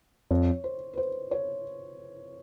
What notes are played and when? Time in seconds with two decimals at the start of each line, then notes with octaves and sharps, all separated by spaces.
0.31 F2 C#5
0.64 C5
0.93 B4
0.97 C5
1.31 C#5